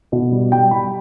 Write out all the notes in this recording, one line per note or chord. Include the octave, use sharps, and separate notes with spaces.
B2
G3
G3 G5
G3 B5